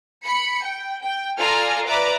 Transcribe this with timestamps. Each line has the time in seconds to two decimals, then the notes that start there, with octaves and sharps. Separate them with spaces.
0.24 B5 C#7
0.63 G5
1.03 G5
1.39 F4 A4 D5 G#5 A#5 F6
1.87 B4 D5 E5 A#5 D6